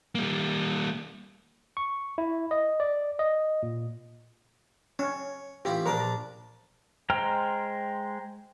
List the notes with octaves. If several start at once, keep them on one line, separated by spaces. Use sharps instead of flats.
G3 A#3
C#6
E4
D#5
D5
D#5
A#2
C#4 C#5
A1 E4 F4 G4
A#1 D4 A#4 A5
G#3 C5 G5 A#5 F6